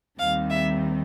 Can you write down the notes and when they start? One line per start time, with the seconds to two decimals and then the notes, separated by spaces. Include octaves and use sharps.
0.20 D#2 D#3 G3 C4 F5
0.50 E5